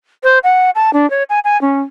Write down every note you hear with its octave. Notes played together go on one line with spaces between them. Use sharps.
C5
F#5
A5
D4
C#5
G#5
G#5
C#4